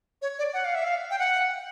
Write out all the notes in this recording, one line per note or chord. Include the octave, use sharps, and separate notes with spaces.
C#5
D5
F#5
F5
E5
F5
G5
F#5